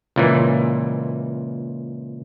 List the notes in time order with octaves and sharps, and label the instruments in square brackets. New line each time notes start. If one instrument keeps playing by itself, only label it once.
[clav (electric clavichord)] C#2 A#2 E3